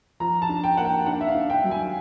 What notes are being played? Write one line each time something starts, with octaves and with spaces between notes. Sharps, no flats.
F3 A#5
A5
D4
G5
A#3 F#5
G5
D4 F#5
E5
F5
D4
G5
F#3
G#5